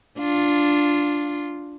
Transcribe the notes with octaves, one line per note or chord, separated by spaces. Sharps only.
D4 F4